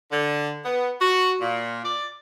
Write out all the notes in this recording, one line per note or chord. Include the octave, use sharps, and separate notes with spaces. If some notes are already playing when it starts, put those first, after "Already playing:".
D3
B3
F#4
A#2
D5